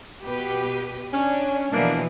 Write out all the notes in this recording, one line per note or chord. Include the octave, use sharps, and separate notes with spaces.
B2 G4 B4
C#4 D4
B2 E3 F3 A#3 D4